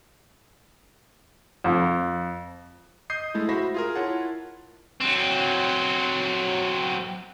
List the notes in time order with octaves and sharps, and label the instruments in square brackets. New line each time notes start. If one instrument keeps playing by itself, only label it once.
[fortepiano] F2
[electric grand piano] D#5 D#6 G6 C7
G#3 A3 E4
F#4 C5 E5 B5 A#6
F4 G#4 A#4
E4 F4 A#4 C#5 F#5 A5
[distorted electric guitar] F#3 C4